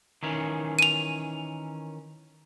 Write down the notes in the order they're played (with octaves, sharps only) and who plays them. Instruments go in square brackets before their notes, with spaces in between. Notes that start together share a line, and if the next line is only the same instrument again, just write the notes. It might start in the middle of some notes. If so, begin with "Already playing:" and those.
[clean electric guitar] D#3 E3 C#4
[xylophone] D#7 F7